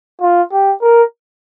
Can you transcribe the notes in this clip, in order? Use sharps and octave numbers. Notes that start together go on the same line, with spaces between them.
F4
G4
A#4